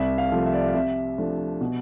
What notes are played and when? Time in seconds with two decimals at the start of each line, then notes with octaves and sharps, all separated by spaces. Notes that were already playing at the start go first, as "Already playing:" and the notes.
Already playing: C2 E5
0.18 F5
0.32 C3 F3 A3
0.46 E5
0.53 D5
0.60 E5
0.68 F5
0.74 C3 E5
1.18 F3 A3 D4
1.61 B2